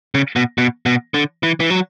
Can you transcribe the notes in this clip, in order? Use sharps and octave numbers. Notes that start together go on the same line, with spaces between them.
C#3
B2
B2
B2
D3
E3
E3
F#3